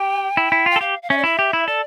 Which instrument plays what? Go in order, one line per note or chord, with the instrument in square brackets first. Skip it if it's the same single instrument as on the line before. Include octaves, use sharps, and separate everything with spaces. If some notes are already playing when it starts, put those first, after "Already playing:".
Already playing: [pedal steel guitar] G4 [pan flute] G5
[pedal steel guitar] E4
E4
[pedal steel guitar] F4 [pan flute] G5
[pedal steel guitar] A4
[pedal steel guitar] G4 [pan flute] F5
[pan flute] F5
[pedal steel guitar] C#4 [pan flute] E5
[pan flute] D5
[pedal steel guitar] E4 [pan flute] E5
[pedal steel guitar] G4
E4
[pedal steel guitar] A4 [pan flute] D5